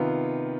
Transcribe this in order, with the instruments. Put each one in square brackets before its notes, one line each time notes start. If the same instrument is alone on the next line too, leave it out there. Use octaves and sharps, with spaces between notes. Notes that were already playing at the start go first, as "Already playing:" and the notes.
Already playing: [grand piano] C3 D#3 B3 F4 B4